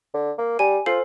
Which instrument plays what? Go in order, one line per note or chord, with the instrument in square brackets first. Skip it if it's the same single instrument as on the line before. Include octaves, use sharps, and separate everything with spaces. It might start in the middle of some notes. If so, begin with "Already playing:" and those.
[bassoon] D3
A#3
[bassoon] G3 [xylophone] G#5
[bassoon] F4 [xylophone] A4 C5 C7